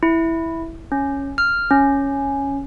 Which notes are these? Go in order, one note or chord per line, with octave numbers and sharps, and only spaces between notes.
E4
C#4
F6
C#4